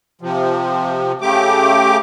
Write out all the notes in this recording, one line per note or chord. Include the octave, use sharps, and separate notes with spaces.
C3 F3
C#3 A3 G4 D6